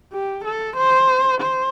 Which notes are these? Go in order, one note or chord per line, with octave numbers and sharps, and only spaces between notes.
G4
A4
C5
C5